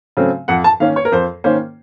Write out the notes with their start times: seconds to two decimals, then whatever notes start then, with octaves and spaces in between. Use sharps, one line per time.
0.17 C#3 F#3 A3 C4
0.48 F2 F#5
0.64 A5
0.80 D#3 A#3 C#4 F5
0.96 C#5
1.05 A#4
1.12 F2 C5
1.44 D#3 A#3 C#4 C5